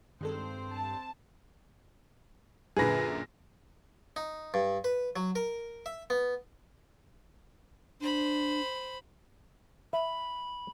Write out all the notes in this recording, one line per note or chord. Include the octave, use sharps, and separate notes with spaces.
G2 D#3 G#3 C4 A4 C5
A5
F#2 A#2 D3 G#4 B4 A#6
D#4
G2
B4
F#3
A#4
E5
B3
D4 C5 B5
E5 B5